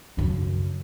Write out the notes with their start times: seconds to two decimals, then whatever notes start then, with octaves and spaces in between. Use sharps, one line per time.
0.17 F#2 C#3